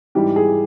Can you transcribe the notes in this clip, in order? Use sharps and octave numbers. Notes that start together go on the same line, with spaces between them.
G#2 E3 G3 G4
G#4